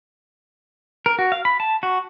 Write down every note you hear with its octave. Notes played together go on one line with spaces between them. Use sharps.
A#4
F#4
F5
B5
A5
F#4